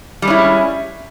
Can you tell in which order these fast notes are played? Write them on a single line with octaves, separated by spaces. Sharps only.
G3 G#3 C#4 E4